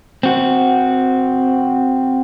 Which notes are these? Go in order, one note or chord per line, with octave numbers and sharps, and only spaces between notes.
C4 F#4